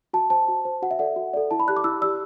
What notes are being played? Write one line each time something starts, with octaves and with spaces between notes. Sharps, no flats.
F#4 A5
C5 A5
F#4
C5
F#4 F#5
E5
A4 D5 F#5
F#4
A4 D5
E4 A5
B5
G4 D5 F#6
D6
E4 E6
G4 D5 E6